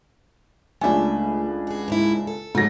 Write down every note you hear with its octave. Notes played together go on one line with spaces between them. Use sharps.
C#2 A3 D4 E5 G#5
F#4 G#4
G#2 A#3 E4
A4
G#2 F#3 A3 A#6